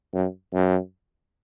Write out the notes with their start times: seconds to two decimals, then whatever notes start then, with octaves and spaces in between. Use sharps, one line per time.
0.14 F#2
0.53 F#2